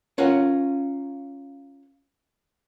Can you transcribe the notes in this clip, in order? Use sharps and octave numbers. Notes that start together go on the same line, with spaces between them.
C#4 F4 A#4 F#5